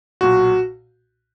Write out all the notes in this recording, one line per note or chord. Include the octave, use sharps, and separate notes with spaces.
B1 A#2 F#4